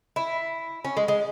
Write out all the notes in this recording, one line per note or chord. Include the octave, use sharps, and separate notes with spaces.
E4
C#4
G#3
G#3